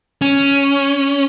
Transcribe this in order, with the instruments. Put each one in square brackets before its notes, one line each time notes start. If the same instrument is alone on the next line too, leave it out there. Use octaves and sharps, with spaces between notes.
[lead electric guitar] C#4